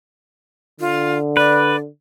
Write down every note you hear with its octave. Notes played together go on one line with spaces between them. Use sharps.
D3 F4
B4 D5